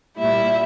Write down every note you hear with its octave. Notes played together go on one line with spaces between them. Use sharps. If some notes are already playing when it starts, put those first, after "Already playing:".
A#2 G3 E4 E5